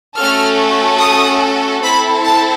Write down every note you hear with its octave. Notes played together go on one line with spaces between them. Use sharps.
A3 C#4 F#4 A4 F6
D#6
C4 E4 A4 B5
A5